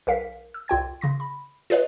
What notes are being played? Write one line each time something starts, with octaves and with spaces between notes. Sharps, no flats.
B1 A#4 F5 B6
E6
C2 F4 G5 G#6
C#3 C6 A#6
B5
F4 G#4 B4 C#5 D#5